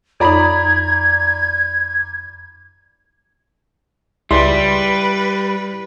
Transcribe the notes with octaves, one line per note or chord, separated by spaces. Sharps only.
F2 D#4 D5 A#5 B5 G#6
C#2 G3 E4 B4 D5 C6